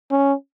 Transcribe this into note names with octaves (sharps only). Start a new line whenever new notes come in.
C#4